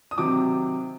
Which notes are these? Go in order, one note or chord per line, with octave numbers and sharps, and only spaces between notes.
D#6
C3 D#3 F#3 C4 D6